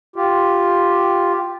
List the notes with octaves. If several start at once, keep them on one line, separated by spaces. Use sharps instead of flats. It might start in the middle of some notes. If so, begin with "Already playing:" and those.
F4 G4